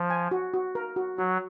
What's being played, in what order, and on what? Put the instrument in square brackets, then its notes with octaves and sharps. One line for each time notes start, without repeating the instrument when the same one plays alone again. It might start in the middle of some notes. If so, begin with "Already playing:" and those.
Already playing: [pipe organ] F3
[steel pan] G#5
F#4
F#4
A#4
F#4
[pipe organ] F#3 [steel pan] F#4